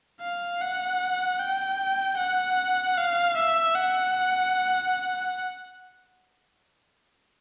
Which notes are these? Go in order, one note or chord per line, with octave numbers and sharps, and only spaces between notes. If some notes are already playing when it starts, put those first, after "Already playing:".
F5
F#5
G5
F#5
F5
E5
F#5